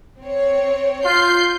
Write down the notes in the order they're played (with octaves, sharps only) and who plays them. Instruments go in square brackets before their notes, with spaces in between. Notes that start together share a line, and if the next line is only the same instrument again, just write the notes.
[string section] C4 C#5
[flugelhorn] F4 [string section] G6 C7